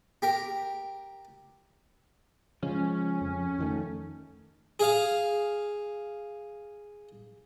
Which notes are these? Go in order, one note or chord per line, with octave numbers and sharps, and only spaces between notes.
G4 A#4
C#3 F3 G#3 C#4
F2
F2 D#3 A3
G#4 F5